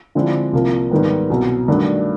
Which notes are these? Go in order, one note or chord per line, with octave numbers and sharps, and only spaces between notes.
D3 F3 G#3 C4 E4
C2 C3 F3 A#3
G#2 D#3 G3 B3
C2 B2 F#3
G2 D#3 F#3 A3 D4